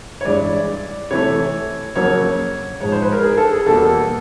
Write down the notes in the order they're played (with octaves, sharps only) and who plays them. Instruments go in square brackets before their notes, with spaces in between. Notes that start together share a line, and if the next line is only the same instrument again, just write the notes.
[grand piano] C#5
G2 E3 G#3 D5
C3 E3 A3 C#5
F2 C#3 F#3 A#3 C#5
G#2 F3 G#3 C#5
C5
B4
A#4
G#4
A4
G#4
E2 B2 G3 A#3 A4